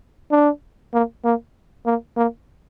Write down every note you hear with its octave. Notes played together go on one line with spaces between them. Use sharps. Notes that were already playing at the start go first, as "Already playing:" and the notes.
D4
A#3
A#3
A#3
A#3